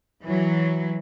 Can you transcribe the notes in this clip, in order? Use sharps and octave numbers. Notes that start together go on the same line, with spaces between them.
E3 F#3